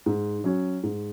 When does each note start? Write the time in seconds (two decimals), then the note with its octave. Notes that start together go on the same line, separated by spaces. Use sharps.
0.06 G#2
0.44 F#3 C#4
0.83 G#2